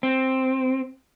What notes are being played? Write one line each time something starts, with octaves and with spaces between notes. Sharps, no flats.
C4